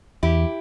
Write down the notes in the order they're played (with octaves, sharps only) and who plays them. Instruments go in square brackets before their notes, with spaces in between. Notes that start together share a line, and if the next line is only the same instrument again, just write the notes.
[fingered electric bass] E2 [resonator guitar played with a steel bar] E4 G4